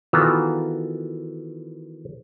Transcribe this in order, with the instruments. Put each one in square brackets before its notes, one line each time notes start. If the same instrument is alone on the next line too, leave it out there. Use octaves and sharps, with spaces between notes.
[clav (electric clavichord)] D#3 E3 B3 F4 F#4 A4